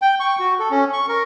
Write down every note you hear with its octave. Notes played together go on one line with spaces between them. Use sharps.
G5
C#6
F#4
A4
C#4
C#6
A#4